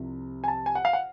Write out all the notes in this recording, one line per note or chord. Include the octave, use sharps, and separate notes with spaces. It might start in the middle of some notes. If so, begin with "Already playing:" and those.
Already playing: C2 C3 F3
G#5
A5
G#5
F#5
F5
F#5